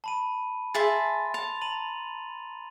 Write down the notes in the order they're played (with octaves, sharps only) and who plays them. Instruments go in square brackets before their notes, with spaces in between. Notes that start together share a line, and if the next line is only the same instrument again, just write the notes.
[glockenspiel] A5 B5 D#7
[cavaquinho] G#4 E5 A5 [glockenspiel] C6 A6
[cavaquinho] A5 [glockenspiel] F7
[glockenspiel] A#5 D#7 F#7